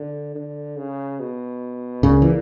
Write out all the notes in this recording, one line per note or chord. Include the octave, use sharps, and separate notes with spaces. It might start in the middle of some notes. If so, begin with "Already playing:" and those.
Already playing: D3
D3
C#3
B2
C#2 A#2 C#3
E3